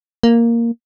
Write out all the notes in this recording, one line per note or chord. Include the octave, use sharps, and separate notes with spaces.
A#3